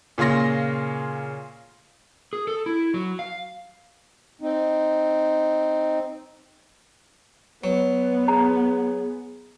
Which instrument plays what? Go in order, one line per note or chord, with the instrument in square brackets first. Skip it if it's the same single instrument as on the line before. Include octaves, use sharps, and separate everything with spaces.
[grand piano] A#2 C#3 F4 C6 A#6
[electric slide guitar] G#4
A4
E4
F#3
F5
[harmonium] C4 D#4
[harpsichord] F#3 [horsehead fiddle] B3 [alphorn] B4
[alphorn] G#4 [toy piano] A#5